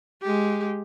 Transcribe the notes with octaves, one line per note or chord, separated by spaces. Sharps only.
G#3 G4